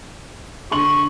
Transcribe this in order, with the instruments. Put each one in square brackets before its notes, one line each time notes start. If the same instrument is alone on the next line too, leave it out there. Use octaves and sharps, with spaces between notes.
[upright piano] D3 C6 F#7 [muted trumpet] C#6